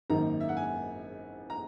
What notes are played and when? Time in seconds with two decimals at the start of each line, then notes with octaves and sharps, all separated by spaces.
0.10 G#1 F#2 D#3 A#3 D#4 A#5
0.40 E5
0.49 F#5
0.57 G#5
1.50 A#5